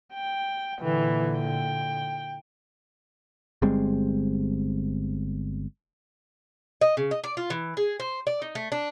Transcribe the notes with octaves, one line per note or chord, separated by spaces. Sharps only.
G5
A#2 D3 E3
G5
G1 G3 G#3 C4
D#5
C#3
D#5
D5
F4
E3
G#4
C5
D5
D#4
A3
D4